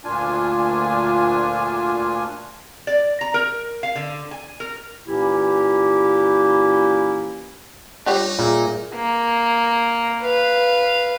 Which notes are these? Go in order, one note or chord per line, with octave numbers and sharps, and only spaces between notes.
D2 A#2 D4 F4 G#5
D5
A#5
A#4
F5
D3
G#5
A#4
A#2 E3 A#3 C#4 E4 G4
G3 D4 D#4 F4 G4 C#5 D6
A#2 G#4 A#4 E5
A#3
B4 F5